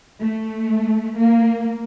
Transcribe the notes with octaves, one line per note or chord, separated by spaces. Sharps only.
A3
A#3